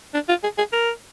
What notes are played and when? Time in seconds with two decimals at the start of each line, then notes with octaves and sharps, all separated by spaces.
0.14 D4
0.29 F4
0.43 G#4
0.58 G#4
0.73 A#4